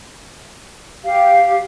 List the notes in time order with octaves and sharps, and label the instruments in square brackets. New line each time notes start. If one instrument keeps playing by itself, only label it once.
[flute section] G4 F5